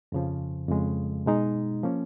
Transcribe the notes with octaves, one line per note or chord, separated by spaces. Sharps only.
F2 C#3 F3
F2 C#3 G#3
B2 G#3 D#4
F3 A#3 C#4